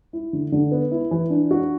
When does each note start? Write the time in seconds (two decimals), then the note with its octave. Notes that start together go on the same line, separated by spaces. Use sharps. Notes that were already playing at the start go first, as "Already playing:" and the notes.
0.13 E4
0.33 D3
0.52 D3
0.72 B3
0.92 E4
1.11 E3
1.30 D4
1.51 F#4